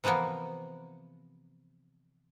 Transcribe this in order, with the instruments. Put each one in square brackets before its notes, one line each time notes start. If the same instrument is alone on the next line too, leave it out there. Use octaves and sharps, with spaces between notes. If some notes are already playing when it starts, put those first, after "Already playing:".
[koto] C3 E3 F3 A#3 B3